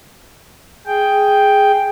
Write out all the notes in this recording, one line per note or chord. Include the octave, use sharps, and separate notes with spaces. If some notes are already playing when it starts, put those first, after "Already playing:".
G#4 G5